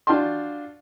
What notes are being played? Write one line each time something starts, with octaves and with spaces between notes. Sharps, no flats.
D4 F4 F#4 G5 A5 C6